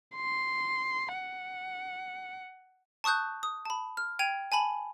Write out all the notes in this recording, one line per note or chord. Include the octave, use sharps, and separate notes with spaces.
C6
F#5
A5 C#6 D#6 F#6 G6
D#6
A5 B5
F6
G5 G#6 D#7 F7
G#5 A5 B5 F#7